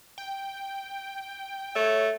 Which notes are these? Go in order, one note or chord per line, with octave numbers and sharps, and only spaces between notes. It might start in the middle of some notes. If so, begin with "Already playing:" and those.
G5
A3 C#5